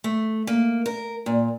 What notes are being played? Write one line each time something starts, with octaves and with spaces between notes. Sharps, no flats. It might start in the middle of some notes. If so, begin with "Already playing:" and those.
A3
A#3
A#4
A#2